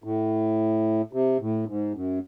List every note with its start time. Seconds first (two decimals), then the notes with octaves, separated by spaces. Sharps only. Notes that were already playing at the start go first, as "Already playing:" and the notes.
0.04 A2
1.13 C3
1.40 A2
1.68 G#2
1.94 F#2